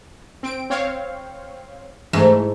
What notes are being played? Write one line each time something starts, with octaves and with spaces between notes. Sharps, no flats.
C4 D7
C4 C#5 F5
G#2 E3 A3